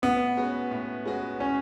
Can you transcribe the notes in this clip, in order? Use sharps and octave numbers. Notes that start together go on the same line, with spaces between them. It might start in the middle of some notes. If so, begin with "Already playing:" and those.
A2 B3
G#3 C#4 F#4 B4
A2
G#3 C#4 F#4 B4
C#4